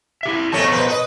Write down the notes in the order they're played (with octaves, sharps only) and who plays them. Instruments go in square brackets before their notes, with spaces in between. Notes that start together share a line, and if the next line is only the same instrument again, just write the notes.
[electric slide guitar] E4 G4 E5
[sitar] F2 A3 C#4 [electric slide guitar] B2 A#4 A5
[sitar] F2 B4 C5
B4 D#5